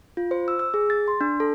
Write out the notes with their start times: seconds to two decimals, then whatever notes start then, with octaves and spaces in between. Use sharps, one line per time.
0.17 F4
0.31 C5
0.48 E6
0.59 E6
0.74 G#4
0.90 A6
1.08 C6
1.21 D4
1.40 A4